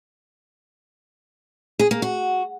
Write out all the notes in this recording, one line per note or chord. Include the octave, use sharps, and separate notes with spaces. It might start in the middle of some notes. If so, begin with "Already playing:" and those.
G#4
A#3
F#4